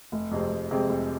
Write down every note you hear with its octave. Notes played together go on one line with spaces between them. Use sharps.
F1
F2 C3 G#3 C4
F1
F2 C3 G#3 C4
F1